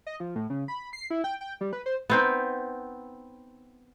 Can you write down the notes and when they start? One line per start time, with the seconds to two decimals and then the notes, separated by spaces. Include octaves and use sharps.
0.07 D#5
0.20 F3
0.35 A2
0.50 C#3
0.68 B5
0.93 C7
1.10 E4
1.24 G5
1.41 G5
1.61 G3
1.73 B4
1.86 C5
2.10 B3 C4 D#4